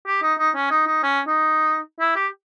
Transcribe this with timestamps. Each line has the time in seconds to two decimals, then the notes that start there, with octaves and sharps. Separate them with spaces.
0.07 G4
0.23 D#4
0.39 D#4
0.55 C#4
0.71 D#4
0.87 D#4
1.03 C#4
1.28 D#4
2.00 E4
2.16 G4